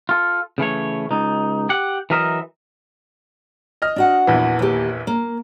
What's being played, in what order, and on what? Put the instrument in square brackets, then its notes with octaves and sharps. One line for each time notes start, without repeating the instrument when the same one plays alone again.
[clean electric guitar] F4 A4
C#3 E3 A3 C#5
C#2 D#4
G4 F#5
E3 F#3 A#4 D#5 E5
[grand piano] D#5 F6
[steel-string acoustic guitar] D4 F#4 F#5
[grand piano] A#1 E2 E3
[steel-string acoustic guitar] D#2 G4
A#3